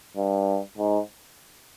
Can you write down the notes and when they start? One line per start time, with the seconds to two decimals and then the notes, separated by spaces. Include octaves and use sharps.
0.17 G2
0.78 G#2